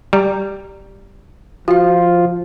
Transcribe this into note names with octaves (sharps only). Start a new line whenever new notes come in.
G3 A#5
F3 F4 F#4 F5